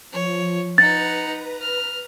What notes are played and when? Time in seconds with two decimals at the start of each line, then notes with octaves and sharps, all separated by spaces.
0.13 F3 C#5
0.78 D#4 B4 F#5 A#5 A6
1.62 F6